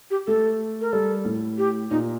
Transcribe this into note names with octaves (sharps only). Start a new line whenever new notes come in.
G4
A3 A4
A#4
G3 A4
A2
G4
A#2 D#4